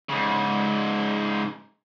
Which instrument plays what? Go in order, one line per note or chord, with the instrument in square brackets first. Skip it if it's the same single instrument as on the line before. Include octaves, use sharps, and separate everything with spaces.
[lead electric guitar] G#2 C#3